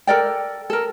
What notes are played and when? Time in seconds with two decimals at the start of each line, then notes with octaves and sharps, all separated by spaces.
0.07 A4 A#4 D5 G5
0.70 A4 A#4